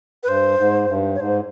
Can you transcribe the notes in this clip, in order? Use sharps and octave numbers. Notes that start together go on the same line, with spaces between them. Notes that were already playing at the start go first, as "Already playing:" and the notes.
B4
G2 C5
G#2
G2
C#5
G#2 C5